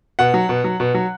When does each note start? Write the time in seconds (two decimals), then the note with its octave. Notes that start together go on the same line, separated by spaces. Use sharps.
0.19 B2 F#5
0.34 F#3
0.49 B2
0.64 F#3
0.80 B2
0.95 F#3